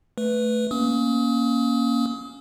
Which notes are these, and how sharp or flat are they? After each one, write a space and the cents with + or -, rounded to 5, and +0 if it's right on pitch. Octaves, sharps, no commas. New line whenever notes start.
A3 +0 B4 +0
A#3 +15 C#4 +0 D#6 +35